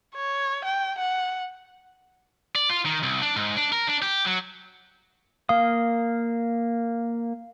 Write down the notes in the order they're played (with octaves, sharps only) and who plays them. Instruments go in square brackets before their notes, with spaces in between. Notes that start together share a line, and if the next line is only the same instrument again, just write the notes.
[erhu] C#5
G5
F#5
[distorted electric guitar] D5
F4
D#3
C2
D4
G#2
D4
A#4
D4
G4
F#3
[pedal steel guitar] A#3 D#6 [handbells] F5